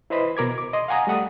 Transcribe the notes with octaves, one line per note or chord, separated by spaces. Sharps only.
E4 B4 C5 D#5 B5
B2 A#4 D6 G#6
D6
D#5 C6
F5 F#5 G#5 A#5 D#6
G3 A3 F#5 D#6